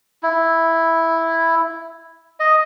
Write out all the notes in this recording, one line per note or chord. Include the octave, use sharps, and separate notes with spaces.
E4
D#5